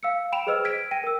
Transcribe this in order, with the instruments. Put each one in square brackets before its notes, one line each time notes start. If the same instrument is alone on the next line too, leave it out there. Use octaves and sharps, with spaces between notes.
[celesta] F5 E6 C#7
G5 B5 D7 E7 F7
G#4 B4 C5 D#5 E6 F6
G#6 B6 D7
G5 A#6 D#7
A#4 E6